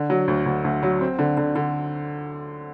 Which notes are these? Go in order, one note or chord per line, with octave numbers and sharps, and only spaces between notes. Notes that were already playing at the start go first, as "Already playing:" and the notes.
Already playing: D3
F#3
D2
D2
D2
F#3
C4
D3
D3
D3